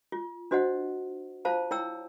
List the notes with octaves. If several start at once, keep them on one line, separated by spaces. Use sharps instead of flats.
F4
D4 F#4 C5 D#5 F#5
F4 C5 F5 A5 A#5
E4 C#5 G5 A#5 E6